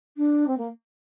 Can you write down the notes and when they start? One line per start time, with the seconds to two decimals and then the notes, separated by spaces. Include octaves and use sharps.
0.17 D4
0.47 C4
0.57 A#3